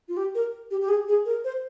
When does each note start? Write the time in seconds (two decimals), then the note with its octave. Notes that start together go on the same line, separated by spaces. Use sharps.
0.08 F4
0.17 G4
0.35 A#4
0.71 G4
0.81 G4
0.89 G#4
1.08 G#4
1.25 A#4
1.44 C5